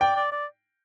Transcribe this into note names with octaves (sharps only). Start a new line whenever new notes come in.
D5 G5
D5
D5